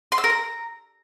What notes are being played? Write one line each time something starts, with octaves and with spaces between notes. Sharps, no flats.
C6
E6
A#4
A#5